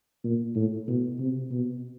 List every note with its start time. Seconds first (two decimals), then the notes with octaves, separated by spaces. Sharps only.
0.24 A#2
0.55 A2
0.88 B2
1.20 C3
1.51 B2